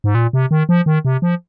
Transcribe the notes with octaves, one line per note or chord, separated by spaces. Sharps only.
G#2
A#2
C3
D#3
F3
D#3
C3
F3